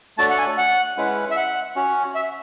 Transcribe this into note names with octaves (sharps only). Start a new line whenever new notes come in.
A3 D4 F#4 A4 C#5 A5
F#5
G#5
F#5
G#3 C#4 E4 B4 F#5
E5
F#5
C#4 F#4 C#5
E5